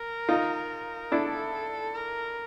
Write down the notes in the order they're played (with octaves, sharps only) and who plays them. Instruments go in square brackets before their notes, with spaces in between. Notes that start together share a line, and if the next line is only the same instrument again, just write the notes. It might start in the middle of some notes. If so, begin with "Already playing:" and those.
Already playing: [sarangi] A#4
[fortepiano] D#4 F4
[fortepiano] D4 E4 [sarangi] A4
[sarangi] A#4